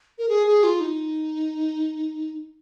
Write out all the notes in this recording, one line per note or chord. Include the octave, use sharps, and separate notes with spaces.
A#4
G#4
G#4
F4
D#4